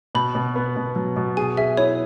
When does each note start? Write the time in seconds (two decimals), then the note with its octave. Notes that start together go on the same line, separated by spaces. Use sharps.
0.15 B2 B5
0.35 B2
0.56 B3
0.76 B2
0.96 F#3
1.17 B2
1.37 G#4 G#5
1.57 G#4 E5
1.77 E4 C#5